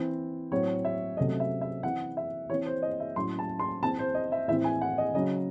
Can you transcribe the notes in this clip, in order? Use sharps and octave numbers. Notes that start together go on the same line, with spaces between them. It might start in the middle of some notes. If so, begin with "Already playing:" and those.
Already playing: E3 C4
A2 F#3 C4 C#5
E5
C3 F#3 A3 C#4 D#5
E5
E5
E3 C4 F#5
E5
E3 C4 C#5
C5
D#5
E5
A2 F#3 C#4 C6
A5
C6
E3 C4 A5
C5
D#5
E5
A2 E3 C4 E5
G#5
F#5
D#5
C#3 F#3 C#4 D#5